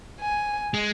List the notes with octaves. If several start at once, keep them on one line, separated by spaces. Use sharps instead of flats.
G#5
G#3